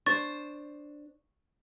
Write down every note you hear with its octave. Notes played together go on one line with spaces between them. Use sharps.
D4 C5 C#6 A6